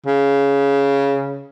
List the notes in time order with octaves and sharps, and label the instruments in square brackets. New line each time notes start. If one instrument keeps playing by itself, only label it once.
[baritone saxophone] C#3